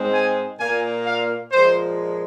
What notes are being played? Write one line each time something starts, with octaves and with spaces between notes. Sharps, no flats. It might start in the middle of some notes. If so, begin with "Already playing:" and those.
Already playing: G#2 G#3 C4
G#5
A#2 A#3 G#5
F5
A#2 F3 G#3 C5